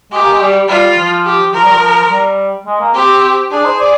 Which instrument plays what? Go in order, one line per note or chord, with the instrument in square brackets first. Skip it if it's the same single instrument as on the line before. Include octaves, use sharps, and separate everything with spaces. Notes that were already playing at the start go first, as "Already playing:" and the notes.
[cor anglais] G#3 [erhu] G4
[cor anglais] A#3
G#3
G3
[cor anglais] G3 [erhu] F4
[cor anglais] F3
[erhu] G4
[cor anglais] F3 [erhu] A#4
[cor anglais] G3
F3
G3
G#3
A#3
[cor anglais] C4 [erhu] G4
[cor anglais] D4 [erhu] G#4
[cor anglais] C5
D5